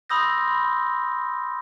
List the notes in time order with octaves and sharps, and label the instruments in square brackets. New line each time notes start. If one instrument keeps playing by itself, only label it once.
[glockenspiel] B5 C6 D#6 E6 G6 A#6